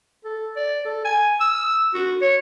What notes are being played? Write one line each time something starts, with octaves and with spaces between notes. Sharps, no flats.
A4
D5
A4
G#5
E6
F#4
C#5